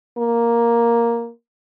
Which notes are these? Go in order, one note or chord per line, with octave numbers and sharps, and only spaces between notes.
A#3